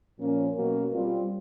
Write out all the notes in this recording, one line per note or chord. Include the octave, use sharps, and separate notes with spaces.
A#2 F3 A#3 C#4
B2 F#3 A#3 C#4 F#4
G3 C4 F4